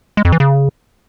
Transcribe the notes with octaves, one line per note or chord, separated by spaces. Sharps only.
G#3
F2
E3
C#3